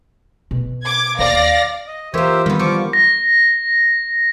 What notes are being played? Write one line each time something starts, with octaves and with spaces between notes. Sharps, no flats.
B2
D6 G#6
D#2 D5 F5 A#6
D#5
E3 F4 G4 A#4 C5 C#5 E5
D#3 G3 B3
F3 F4 C#6 D6
A#6